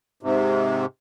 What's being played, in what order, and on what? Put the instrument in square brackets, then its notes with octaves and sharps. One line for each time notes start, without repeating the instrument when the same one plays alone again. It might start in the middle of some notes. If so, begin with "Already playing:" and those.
[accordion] G#2 C3